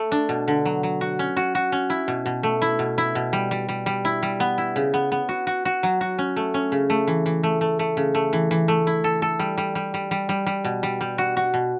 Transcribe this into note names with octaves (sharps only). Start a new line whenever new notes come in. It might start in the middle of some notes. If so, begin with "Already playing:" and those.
Already playing: A3
D4
B2
D3
F#3
F#3
F#4
C#4
F#4
F#4
C#4
E4
B2
B2
A3
E4
B2
E4
B2
G3
G3
G3
G3
E4
G3
B3
E4
C#3
B3
B3
F#4
F#4
F#4
F#3
F#4
C#4
A3
C#4
C#3
A3
E3
E3
A3
A3
A3
C#3
A3
E3
E3
A3
E4
A4
A4
G3
G3
G3
G3
G3
G3
G3
B2
G3
G3
F#4
F#4
B2